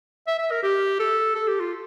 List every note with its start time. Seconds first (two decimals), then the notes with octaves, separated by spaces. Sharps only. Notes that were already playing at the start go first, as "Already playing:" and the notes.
0.27 E5
0.38 E5
0.51 A#4
0.63 G4
1.00 A4
1.35 A4
1.48 G4
1.60 F4